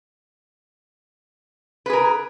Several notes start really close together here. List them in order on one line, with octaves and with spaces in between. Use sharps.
B4 G#4 A#4